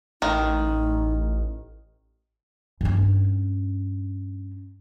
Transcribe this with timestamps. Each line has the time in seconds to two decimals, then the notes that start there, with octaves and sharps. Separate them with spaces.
0.22 A1 D#3 D#4
2.81 G2 C#4